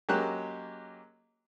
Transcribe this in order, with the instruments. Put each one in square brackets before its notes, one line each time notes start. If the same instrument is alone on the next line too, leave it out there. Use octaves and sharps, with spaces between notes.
[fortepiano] F#3 G#3 A#3 C#4 G4 F#6